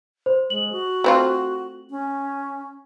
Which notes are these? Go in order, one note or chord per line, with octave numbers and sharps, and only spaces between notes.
C5
G#3 F#7
F#4
A3 C4 F4
C#4